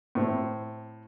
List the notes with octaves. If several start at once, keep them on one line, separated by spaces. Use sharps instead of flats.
A2 C4